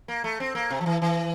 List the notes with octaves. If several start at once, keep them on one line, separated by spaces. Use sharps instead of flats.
A#3
A3
C4
A#3
C3
F3
E3
E3